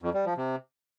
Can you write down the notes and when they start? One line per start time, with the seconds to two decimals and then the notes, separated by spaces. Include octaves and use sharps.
0.02 F2
0.14 G3
0.25 F3
0.37 C3